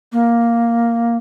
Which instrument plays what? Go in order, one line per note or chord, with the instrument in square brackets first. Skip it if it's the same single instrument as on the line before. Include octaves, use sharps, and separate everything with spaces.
[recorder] A#3